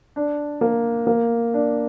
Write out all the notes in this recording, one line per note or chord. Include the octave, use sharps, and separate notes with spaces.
D4
A#3
A#3
D4